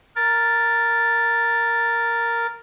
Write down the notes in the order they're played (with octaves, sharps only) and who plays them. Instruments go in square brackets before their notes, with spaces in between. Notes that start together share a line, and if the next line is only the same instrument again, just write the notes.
[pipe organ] A#4 A6